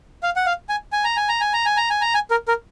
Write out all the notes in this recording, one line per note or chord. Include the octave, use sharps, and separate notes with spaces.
F5
F#5
F5
G#5
G#5
A#5
G#5
A#5
G#5
A#5
G#5
A#5
G#5
A#5
G#5
A#4
A#4